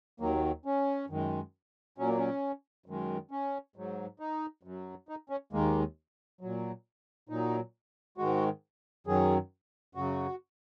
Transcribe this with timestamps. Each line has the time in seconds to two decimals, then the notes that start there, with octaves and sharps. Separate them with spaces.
0.20 D#2 D#3 F#3 A#3
0.65 C#4
1.09 F#2 D#3 G#3
1.98 A#2 F#3 C#4
2.07 A#3
2.18 C#4
2.86 F#2 D#3 G#3
3.31 C#4
3.76 G#2 F#3
4.20 D#4
4.63 F#2 F#3
5.09 D#4
5.30 C#4
5.53 D#2 D#3 G#3 A#3
6.41 A#2 F#3
7.29 A#2 F#3 D#4
8.18 G#2 D#3 G#3 F#4
9.07 F#2 D#3 F#3 G#4
9.95 F#2 C#3 F#3 F#4